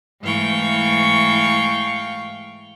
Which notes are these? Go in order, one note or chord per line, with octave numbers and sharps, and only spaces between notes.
G#2 E3 A3 F5 G5 C#6